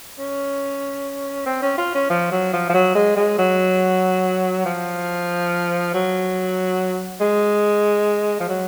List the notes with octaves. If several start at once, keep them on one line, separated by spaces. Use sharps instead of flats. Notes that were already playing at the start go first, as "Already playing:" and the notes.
C#4
C4
C#4
F4
C#4
F3
F#3
F3
F3
F#3
G#3
G#3
F#3
F3
F#3
G#3
F3
F#3